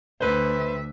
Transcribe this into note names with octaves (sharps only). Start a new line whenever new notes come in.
D2 B4 C5 E5